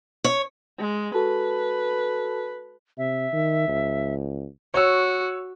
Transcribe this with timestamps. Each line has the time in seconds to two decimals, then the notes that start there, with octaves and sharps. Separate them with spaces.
0.24 C#5
0.79 G#3
1.14 F#4 A4 B4 A5
2.98 C3 E5
3.33 D#3
3.68 C#2
4.74 F#4 C#5 E6